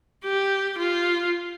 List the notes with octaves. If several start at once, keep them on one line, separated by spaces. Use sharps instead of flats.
G4
F4